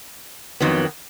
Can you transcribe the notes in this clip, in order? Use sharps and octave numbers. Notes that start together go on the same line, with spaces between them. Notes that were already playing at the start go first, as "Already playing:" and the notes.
F2 D#3 F#3 B3